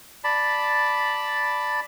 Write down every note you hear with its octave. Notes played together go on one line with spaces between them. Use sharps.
D5 A5 B5